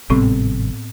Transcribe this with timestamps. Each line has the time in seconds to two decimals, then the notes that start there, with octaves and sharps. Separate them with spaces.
0.10 G#1 A2 C3 G3 B3 C4